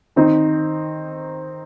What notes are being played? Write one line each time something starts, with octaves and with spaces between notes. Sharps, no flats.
D#3 C4 D#4